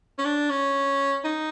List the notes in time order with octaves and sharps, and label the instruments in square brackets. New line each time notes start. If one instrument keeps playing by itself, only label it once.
[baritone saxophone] C#4
D4
C#4
D#4